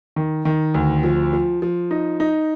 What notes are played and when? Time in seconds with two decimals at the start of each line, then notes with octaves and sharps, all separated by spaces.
0.16 D#3
0.45 D#3
0.74 D2
1.03 F3
1.33 F3
1.62 F3
1.91 D#4
2.20 D#4